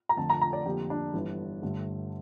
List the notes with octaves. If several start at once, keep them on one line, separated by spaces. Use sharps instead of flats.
A#5
F2 D3 A3 A5
A#5
A#5
D5
F2 D3 G3 A#3 G4
D4
G1 G2 E3
G1 G2 D3 A3